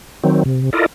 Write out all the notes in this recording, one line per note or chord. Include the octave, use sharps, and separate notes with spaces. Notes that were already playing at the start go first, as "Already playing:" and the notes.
D#3 F#3 C4
C3
E4 F4 A4 A#4 D5 D#5